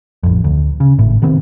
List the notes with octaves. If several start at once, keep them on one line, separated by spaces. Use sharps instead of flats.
A1 F2
D2
C#3
G#1 A2
C3 D#3 B3 C4